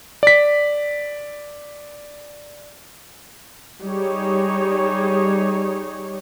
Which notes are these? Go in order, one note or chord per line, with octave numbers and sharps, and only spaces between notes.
D5 B6
G3 D#4 G#4 C#5